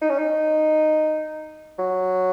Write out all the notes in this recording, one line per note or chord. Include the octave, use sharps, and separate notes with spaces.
D#4
C#4
D#4
F#3